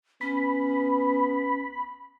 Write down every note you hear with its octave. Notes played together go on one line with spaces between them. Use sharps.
B3 C#4 B5